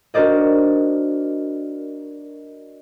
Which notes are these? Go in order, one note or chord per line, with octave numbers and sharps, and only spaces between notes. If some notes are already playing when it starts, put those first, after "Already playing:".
D4 F#4 A#4 C5 D5 D#5